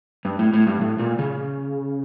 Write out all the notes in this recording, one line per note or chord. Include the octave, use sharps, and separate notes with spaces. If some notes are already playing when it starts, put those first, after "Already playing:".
G2
A2
A2
G2
A2
A#2
C#3